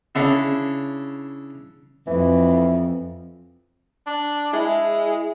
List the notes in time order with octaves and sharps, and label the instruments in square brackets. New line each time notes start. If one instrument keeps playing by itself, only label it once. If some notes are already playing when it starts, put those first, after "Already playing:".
[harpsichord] C#3 D4 E4
[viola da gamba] F2 [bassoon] E3
[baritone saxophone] D4
[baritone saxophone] G#3 [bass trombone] E4